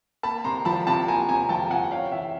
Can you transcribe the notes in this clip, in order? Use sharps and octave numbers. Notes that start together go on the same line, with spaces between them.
A#3 A5 B5
C3 A#5 C6
F3 A5 B5
C3 A5 B5
A#3 G#5 A#5
C3 G#5 A#5
F3 G5 A5
C3 F#5 G#5
C#4 F5 G5
E3 E5 F#5